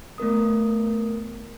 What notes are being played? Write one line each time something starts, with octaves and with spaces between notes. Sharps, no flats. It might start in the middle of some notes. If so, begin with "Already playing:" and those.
A3 B3 A#4 D#6